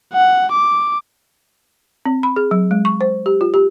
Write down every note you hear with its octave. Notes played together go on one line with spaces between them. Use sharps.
F#5
D6
C4
B5
G#4
F#3
G#3
C#6
C5
G4
F4
G4